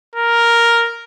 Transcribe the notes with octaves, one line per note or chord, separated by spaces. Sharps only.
A#4